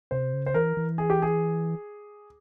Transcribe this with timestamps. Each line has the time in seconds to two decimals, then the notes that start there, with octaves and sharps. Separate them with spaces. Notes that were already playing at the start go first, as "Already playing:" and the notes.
0.11 C3 C5
0.34 C#3
0.46 C5
0.54 E3 A#4
0.77 E3
0.98 G#4
1.10 G4
1.22 G#4